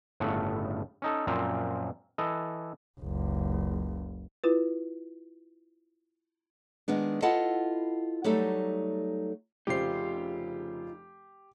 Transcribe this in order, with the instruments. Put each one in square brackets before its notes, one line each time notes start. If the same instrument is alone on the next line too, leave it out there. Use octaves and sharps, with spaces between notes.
[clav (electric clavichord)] G1 A2 C#3 A3 F#5
C#4 D#4 A4
F#2 A#2 F3 C4 A#5
E3 A4 D#5
[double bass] F#1 C#2
[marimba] E4 F4 B4
[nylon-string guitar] D#3 G#3 B3 D4
E4 F4 A4 D#5 F#5 A5
F#3 G3 A3 D#4 A4
[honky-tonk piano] F1 C#3 C5 [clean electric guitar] D#4 F4 [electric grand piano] G4 C7